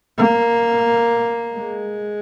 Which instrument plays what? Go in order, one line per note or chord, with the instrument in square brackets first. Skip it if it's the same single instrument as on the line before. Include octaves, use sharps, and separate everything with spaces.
[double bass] A#3
G#3